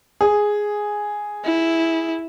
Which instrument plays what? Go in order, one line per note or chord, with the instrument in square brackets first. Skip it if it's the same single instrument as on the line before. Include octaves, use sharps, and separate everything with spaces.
[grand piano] G#4
[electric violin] E4